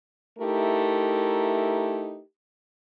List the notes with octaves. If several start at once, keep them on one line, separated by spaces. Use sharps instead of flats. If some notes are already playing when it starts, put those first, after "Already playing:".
A3 D#4 E4 G4 A#4